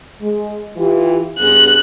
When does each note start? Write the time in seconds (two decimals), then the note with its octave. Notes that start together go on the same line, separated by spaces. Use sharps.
0.21 G#3
0.75 E3 F4 G4
1.39 G2 B3 G#4 F#6